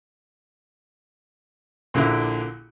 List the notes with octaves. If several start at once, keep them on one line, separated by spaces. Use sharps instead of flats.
A#1 A#2 D3 E4